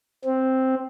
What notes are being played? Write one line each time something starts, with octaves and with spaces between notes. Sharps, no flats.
C4